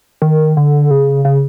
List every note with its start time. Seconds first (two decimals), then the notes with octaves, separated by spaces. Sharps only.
0.22 D#3
0.57 D3
0.91 C#3
1.25 C#3